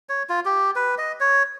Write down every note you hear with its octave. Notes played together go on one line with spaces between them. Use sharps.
C#5
F4
G4
B4
D#5
C#5